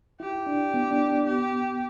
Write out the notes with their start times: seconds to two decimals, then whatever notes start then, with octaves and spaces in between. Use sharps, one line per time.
0.20 E4 G4
0.47 D4
0.74 B3
0.91 D4
1.09 D4
1.26 B3 G4